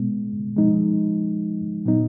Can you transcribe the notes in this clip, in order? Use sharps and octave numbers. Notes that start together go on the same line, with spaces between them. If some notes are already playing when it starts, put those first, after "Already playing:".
Already playing: B2 G#3 B3
F3 G#3 D#4
A#2 F#3 B3 D#4